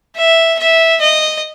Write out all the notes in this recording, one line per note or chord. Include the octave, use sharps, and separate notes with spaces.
E5
E5
D#5